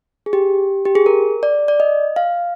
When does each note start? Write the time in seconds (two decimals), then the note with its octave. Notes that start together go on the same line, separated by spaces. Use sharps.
0.26 G#4
0.33 G4
0.85 G4
0.95 G#4
1.06 A#4
1.43 D5
1.68 D5
1.80 D#5
2.16 F5